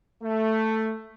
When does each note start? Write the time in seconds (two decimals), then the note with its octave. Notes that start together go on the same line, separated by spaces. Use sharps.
0.23 A3